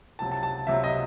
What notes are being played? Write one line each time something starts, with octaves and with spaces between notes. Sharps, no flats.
C#2 C3 F#3 A5
A5
A5
C#2 C3 F#3 E5
D#5